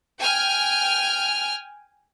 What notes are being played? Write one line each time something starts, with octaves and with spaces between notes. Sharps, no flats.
G5 G#5 F6